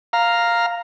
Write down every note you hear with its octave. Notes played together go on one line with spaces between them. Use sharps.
F5 A#5